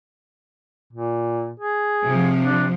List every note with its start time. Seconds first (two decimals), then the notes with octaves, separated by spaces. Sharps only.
0.93 A#2
1.60 G#4
2.03 C3 F3
2.44 D4